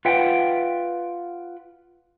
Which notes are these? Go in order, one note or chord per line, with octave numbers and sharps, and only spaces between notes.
F4 B4 E5 F#5 G5